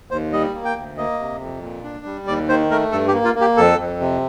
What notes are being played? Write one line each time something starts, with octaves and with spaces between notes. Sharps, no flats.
D#2 C5
G3 D#5
A#3
G5
D2
A#3 D#5
C3
F2
A#2
D4
G3
D#2 D5
D#3 C5
A3 A#4
G2 A4
G4
A#3
F4
A#3
G4
F2 A4
F2
C3